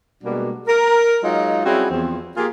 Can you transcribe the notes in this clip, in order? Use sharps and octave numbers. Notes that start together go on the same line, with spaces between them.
B2 G3 G#3 A#3 D4 F#4
A#4
F#3 G#3 D#4 F4
G3 C4 C#4 E4 F#4 G#4
E2 F3 C4
A#3 F4 G4 G#4